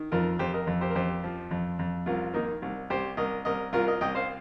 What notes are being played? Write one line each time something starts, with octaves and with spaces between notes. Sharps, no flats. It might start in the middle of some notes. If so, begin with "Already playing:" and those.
Already playing: D#3
F2 F4 A#4
F2 G4 C5
A#4 D#5
F2
G4 C5
A#4
F2 G4 C5
F3
F2
F2
C2 F4 A#4
D#3 A#3 D#4
C2
C2 G4 C5
C2 A#4 D#5
C2 A#4 D#5
C2 F4 A#4
A#4 D#5
C2 D#5 G5
C5 F5